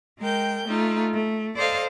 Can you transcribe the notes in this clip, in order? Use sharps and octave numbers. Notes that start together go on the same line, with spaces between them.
G#3 A#4 G5 G6
A3 D#4 F4
A3
A4 C5 D5 D#5 F5